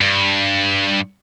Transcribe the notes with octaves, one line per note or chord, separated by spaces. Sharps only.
G2